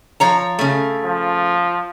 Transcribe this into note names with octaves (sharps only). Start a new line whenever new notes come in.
F3 C#5 A#5
C#3 A3
F3